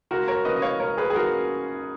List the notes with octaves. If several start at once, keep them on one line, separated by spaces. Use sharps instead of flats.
C#2 F#4 A#4
A#4 C#5
C#3 F3 A#3 C#4 B4 D#5
D#5
C#5 F5
C#2 A#4 C#5
G#4 B4
G#4
C#3 F3 A#3 C#4 F#4 A#4